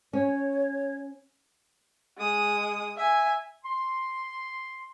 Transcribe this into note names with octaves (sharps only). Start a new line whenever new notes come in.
C#4 C#5
G#3 D#6
E5 G#5
C6